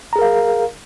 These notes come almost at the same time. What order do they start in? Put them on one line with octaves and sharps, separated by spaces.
A#5 G#4 A#4 F5